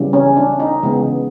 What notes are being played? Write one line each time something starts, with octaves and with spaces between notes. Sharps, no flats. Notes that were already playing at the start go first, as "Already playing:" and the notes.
Already playing: C#3 E3 G3
C#4
D4
D#4
C#3 E3 G#3 B3